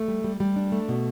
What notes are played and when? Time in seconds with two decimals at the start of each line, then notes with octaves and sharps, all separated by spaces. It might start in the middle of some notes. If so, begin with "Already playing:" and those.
Already playing: A3
0.08 G3
0.24 G3
0.40 G3
0.56 D4
0.72 A3
0.89 B2